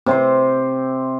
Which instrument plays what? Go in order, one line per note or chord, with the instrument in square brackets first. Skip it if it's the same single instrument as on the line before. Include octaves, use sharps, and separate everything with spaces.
[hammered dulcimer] C3 C4 C5